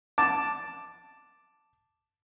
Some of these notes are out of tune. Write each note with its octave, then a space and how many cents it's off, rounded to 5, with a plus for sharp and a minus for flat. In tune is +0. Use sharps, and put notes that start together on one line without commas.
A5 +0 D6 +0